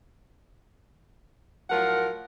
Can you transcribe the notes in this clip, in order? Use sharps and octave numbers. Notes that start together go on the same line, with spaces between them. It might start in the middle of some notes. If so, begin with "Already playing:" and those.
A2 F3 F#3 F4 A#4 F#5